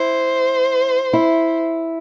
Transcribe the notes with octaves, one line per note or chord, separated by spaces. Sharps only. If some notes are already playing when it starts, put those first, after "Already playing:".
Already playing: E4 C5
E4